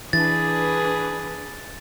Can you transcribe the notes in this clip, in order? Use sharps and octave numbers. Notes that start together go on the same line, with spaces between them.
E3 D4 G#4 B4 A6